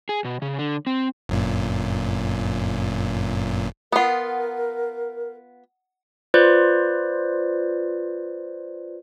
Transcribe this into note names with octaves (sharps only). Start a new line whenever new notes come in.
G#4
B2
C#3
D3
C4
G1 F#2 A#2
B3 F4 A#4 F#5 D#6
F4 B4 C5 D5